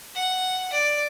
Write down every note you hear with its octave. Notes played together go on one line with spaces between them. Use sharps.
F#5
D5